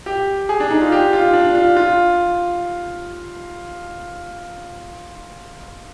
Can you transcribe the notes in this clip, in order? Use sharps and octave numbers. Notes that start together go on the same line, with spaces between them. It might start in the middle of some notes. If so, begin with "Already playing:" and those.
G4
G#4
D4
D#4
F4
G4
F4
D4
F4
F4